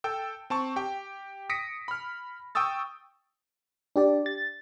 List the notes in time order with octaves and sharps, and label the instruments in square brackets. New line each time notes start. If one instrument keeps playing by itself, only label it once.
[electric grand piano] A4 G5 E6
C4 A5 C#6
G4 G5
D#6 A#6 B6 C#7 D7
B5 F6
G5 C#6 D#6 E6 A6
[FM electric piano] D4 G4 D5
A6